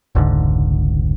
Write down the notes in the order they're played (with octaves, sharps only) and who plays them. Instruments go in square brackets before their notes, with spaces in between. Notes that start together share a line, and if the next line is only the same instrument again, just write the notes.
[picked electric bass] F1 C#2 G#2 D3